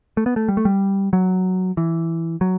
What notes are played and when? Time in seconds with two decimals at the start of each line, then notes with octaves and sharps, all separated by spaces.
0.17 A3
0.26 B3
0.36 A3
0.48 G3
0.57 A3
0.65 G3
1.13 F#3
1.77 E3
2.41 F#3